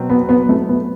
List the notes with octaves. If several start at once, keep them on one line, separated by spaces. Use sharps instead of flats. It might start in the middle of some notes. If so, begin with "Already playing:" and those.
Already playing: B2 F#3 C4
B3
B3
A3
B3